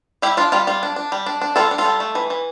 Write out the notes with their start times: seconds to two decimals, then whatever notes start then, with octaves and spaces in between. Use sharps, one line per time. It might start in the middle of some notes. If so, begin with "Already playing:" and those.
0.22 G3 E4 G4
0.37 D4 F4
0.52 G3 F4
0.67 G3 F4
0.83 D4
0.96 D4
1.12 G3
1.26 D4
1.41 D4
1.56 G3 F4 A4
1.71 D4
1.78 F4 A4
1.85 G3
2.00 A3
2.15 E3
2.30 E3